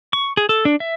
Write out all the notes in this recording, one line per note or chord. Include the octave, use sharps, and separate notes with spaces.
C#6
G#4
A4
D4
E5